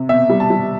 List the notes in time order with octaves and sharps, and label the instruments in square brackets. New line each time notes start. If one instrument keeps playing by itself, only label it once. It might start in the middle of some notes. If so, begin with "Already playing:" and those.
Already playing: [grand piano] C3
B2 E5
G3
A5
G3